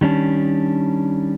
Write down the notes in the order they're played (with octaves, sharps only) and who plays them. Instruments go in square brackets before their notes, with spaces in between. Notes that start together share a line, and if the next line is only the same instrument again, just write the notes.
[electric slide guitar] D#3 G3 C#4 D4